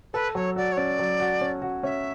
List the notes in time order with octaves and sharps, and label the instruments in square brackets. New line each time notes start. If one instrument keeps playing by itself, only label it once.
[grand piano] A4 [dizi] B4
[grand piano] F#3 [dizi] C#5
[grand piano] F#4 [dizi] D5
[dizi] C#5
[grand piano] C#4 [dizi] D5
[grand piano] F#3
F#4
C#4
F#4
[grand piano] C#4 [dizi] E5